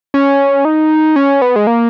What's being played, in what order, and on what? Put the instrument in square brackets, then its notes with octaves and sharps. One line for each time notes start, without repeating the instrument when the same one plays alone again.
[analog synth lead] C#4
D#4
C#4
B3
G#3
A#3